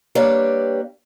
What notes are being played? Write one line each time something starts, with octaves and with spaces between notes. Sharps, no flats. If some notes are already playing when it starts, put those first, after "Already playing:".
G3 A#3 D4 G4 B4 C#5